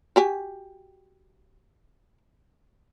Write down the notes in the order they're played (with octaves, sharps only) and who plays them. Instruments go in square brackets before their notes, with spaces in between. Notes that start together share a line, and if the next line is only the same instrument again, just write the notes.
[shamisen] F#4 G4 G#5